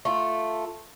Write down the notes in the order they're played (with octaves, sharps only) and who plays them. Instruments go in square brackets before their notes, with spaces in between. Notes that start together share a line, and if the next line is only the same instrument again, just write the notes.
[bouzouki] A3 F4